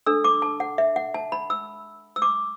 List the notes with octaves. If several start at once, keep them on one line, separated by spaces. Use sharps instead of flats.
D4 A4 E6
D6
A5
F#5
E5
F#5
A5
B5
E6
E6
D6